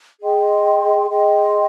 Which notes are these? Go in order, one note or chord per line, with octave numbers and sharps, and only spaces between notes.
G#4 D#5 G5 C6
G#4 D#5 G5 C6